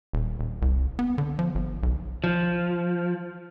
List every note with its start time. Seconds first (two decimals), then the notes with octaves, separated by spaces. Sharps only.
0.13 D#1
0.39 D#1
0.62 C2
0.99 B3
1.18 D3
1.39 F3
1.55 G1
1.83 B1
2.24 F3